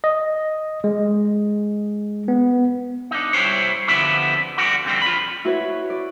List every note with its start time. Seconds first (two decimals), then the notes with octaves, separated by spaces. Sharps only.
0.04 D#5
0.84 G#3
2.28 B3
3.11 D4 D#4
3.33 G3 E4 C5 C#5
3.88 D3 F3 B3 C4 E4 G4
4.58 D3 G3 F#4 D5
4.85 F2 D3 G3 C4
5.02 F4 B5
5.45 E4 F#4 B4 C#5
5.90 D5